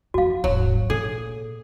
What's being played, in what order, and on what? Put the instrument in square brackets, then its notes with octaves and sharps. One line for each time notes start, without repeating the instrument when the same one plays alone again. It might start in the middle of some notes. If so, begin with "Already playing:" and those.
[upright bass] F2 F3 [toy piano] F#4 F5
[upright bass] D#1 G#1 [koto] F#3
[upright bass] A#2 [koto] G#4 [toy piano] A4